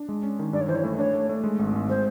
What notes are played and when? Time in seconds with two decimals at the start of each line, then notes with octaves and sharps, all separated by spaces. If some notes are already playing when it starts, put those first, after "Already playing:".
Already playing: D4
0.09 G#3
0.23 C#4
0.39 D#3
0.53 G2 D5
0.61 C#5
0.68 E3 C5
0.75 C#5
0.84 A3
0.98 D4 C#5
1.14 A3
1.29 A3
1.44 G#3
1.59 G#1
1.73 G#1
1.89 G#3 C5